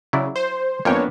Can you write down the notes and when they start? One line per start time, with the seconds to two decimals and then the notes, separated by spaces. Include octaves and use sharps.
0.13 C#3 F#3 E4 D5
0.36 C5
0.85 F2 A#3 B3 C#4 D4 C#5 G5